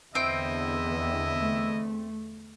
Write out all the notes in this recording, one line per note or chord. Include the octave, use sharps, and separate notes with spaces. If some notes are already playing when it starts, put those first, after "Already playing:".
E2 D3 C4 E4 D#5 E5 G5
A3